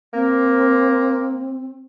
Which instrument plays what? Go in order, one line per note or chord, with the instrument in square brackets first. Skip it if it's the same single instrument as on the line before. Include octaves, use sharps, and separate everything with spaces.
[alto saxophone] A#3 [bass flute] C4